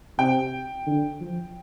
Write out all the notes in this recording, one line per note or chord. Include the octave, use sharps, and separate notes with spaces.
C3 G5
D3
F3